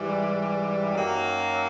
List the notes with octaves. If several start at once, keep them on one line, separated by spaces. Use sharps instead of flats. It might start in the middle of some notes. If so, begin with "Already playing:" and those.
Already playing: G#2 E3 G3
F#2 D#3 F#3 A#3